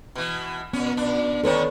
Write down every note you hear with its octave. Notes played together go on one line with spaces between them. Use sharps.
B2 E3
A#2 B3 C#4
A#2 D4
D3 D#3 D4 A4 B4 C#5